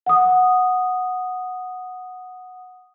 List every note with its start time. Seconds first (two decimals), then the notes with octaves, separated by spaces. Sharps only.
0.06 F#5 D#6